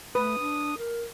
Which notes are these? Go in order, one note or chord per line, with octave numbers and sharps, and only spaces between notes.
A3 B4 D#6
D4
A#4